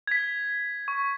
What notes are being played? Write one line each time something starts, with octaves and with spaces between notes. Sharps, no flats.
G#6 B6
C#6